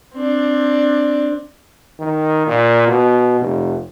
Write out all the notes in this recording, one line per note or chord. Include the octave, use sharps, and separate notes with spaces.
C4 D4
D#3
A#2
B2
F1